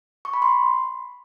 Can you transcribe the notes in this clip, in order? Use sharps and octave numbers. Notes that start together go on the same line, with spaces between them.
C#6
B5
C6